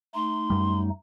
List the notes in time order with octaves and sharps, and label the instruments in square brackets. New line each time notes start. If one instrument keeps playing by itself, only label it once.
[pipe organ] A3 D#4 [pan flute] C6
[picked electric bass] F#2 G3